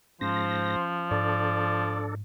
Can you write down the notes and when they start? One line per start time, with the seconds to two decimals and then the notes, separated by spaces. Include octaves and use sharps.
0.21 G#2 F3 C#4 C5 A#6
1.11 G#2 D4 A4 D5